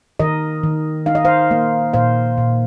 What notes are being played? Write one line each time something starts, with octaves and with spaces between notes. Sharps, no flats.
D#3 A#4 D#5
D#3
D#4 F5
D#5
C5 F5
A#3
A#2 C5 F5
A#2